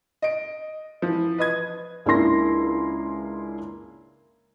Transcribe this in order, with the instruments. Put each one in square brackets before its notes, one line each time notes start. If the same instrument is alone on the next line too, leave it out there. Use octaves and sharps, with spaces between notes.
[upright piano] D#5 D7
E3 F3
B4 D#5 D#6 G#6
[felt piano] C#2 A#3 D4 E4 C6 A#6